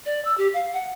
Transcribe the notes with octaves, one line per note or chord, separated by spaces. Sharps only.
D5
E6
G4
F5
F#5